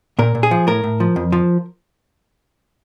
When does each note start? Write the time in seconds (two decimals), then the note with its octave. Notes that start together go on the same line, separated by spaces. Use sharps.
0.19 A#2 A#4
0.35 A#2
0.43 G#4
0.51 F3
0.67 A2 A#4
0.84 A2
1.00 F3
1.16 F2
1.32 F3